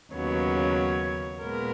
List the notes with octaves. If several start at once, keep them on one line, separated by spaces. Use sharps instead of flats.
D#2 C#3 F#3 B3 C#5
A#2 G#3 B3 A#4